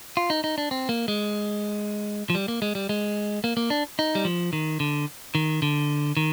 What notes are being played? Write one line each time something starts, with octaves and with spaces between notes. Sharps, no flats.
F4
D#4
D#4
D4
C4
A#3
G#3
F3
G3
A#3
G#3
G3
G#3
A#3
A#3
D4
D#4
G3
F3
D#3
D3
D#3
D3
D#3